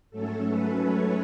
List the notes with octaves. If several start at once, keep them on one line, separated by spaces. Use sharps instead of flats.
G#2 F#3 A3 C#4 A4
B4
C#5